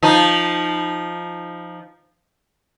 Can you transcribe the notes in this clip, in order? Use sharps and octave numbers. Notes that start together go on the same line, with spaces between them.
F3 D#4